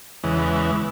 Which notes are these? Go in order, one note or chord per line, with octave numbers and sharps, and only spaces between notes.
E2 C#3 E3 G#3